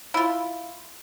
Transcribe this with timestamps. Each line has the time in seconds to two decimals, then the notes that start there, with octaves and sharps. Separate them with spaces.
0.14 E4 F4